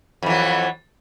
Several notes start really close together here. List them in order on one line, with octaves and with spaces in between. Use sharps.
F2 E3 F#3